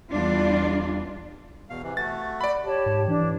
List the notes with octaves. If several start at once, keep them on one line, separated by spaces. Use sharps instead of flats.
E2 G3 D4 F4
E2 B2 F5
C3 E3
A3 F#4 A6
D5 B5
G4 C#5 A5
G#2
E3 D4